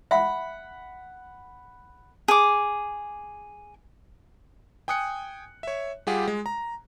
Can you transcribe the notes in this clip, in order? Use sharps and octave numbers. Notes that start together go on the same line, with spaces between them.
E5 F#5 B5
G#4 D6
G5 G#5 D#6 F#6 C#7
C#5 E5
G3 F4 G4 G#4 F#5
G#3
A#5